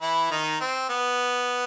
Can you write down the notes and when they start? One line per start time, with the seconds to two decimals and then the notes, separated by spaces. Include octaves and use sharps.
0.02 E3 E4
0.31 D#3 D#4
0.61 C4
0.89 B3